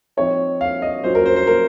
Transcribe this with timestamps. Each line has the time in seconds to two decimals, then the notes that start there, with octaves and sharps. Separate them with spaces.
0.17 F3 C4 D#4 C#5
0.61 F5
0.82 D#5
1.04 F#3 C#4 F4 C5
1.15 A#4
1.26 C5
1.36 C5
1.47 A#4